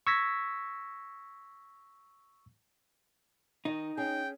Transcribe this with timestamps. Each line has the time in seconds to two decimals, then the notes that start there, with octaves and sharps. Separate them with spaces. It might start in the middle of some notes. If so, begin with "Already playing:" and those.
0.07 C#6 E6 G#6 A#6 B6
3.65 D#3 D#4
3.97 C#4 G#4 G5